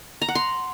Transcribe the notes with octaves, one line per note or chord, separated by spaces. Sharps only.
A#5
F#5
C6